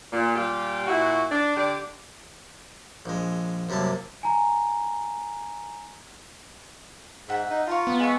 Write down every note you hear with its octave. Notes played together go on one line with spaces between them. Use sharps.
A#2
A#2 G3 F4 G4
A#2 E4 F#4
D4
D3 D4 G4 D5
A#1 G#3
F#2 C3 G3 A#3 A5
G#5 A#5
G#2 E5 F#5
D#4
F4 A#5 C#6
B3
G#3 E5 C#6